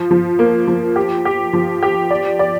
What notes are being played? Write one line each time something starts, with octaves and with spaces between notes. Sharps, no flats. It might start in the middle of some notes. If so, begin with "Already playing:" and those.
Already playing: F3
F3
A#3
F3
G4
G4
F3
G4
D5
D5